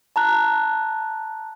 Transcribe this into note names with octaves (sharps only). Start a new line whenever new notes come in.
A5 A#5 F#6